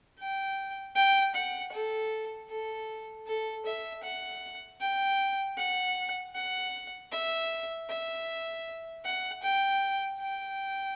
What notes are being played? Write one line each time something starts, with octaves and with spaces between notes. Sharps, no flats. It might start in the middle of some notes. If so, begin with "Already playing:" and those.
G5
G5
F#5
A4
A4
A4
E5
F#5
G5
F#5
F#5
E5
E5
F#5
G5
G5